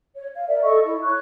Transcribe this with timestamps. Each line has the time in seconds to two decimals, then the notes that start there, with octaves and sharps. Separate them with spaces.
0.16 C#5
0.35 F5
0.48 A#4 D5 E5
0.63 A4 D#5 C#6
0.85 E4
1.03 C#5 C#6 F#6